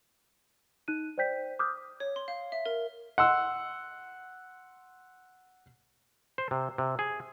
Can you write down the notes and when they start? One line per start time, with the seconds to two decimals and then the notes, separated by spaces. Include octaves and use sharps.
0.88 D#4 F#6 D#7
1.18 C5 D5 G5 G6 B6
1.59 D6 D#6 F6 G6
2.00 C#5
2.16 C6
2.28 F5
2.52 E5
2.66 A#4
3.18 F#5 C6 E6
6.38 C5
6.51 C3
6.78 C3
6.99 G#4